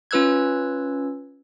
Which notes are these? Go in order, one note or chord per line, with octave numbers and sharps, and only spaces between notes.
C#4 F4 B4 E6 F#6 G#6